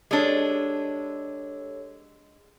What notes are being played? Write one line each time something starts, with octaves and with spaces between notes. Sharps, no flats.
G#3 D4 G4 A4 C#5